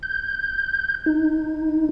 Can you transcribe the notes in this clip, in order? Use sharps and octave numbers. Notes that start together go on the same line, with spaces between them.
G6
D#4